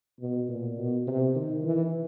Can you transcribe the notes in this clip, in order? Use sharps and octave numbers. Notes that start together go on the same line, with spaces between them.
B2
A#2
B2
C3
D#3
E3